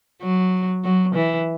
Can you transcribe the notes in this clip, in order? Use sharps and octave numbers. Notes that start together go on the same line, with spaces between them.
F#3
F#3
E3